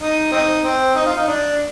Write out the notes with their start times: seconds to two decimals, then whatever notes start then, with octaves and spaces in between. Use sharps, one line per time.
0.01 D#4
0.32 C4 D#4
0.64 C4
0.96 D#4
1.07 F4
1.17 D#4
1.28 D4